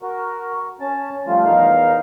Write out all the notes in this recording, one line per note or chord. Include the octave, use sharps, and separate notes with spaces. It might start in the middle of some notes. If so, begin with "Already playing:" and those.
F#4 A#4
C#4 A5
F3 G3 A3 F4
E2 D#4 A#4 F5